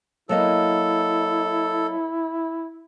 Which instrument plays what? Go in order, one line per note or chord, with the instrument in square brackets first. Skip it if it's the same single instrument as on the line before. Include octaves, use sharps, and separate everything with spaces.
[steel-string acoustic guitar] F#3 A#3 D#5 [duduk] E4 [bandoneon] A4